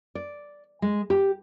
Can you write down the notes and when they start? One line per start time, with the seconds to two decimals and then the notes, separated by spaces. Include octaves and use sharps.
0.15 D5
0.82 G#3
1.10 G4